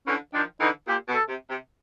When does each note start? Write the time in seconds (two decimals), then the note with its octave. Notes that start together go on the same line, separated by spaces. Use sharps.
0.06 D3 E3 C#4
0.34 D#3 F3 D4
0.61 D3 E3 D#4
0.88 A#2 G4
1.08 B2
1.15 A4
1.28 C3
1.49 C3